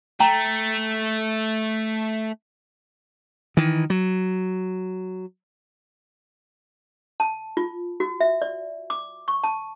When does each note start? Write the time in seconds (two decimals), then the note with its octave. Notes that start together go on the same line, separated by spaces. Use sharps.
0.20 A3 G5 A#5
3.57 D#3 E3
3.90 F#3
7.20 A5
7.57 F4
8.00 F#4
8.21 E5
8.42 D5
8.90 D6
9.28 C#6
9.44 A5